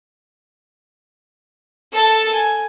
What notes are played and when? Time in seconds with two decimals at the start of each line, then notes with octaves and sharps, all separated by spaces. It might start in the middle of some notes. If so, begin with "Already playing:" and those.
1.92 A4 A5
2.34 G#5